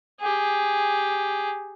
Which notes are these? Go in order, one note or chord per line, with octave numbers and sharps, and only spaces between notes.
G4 G#4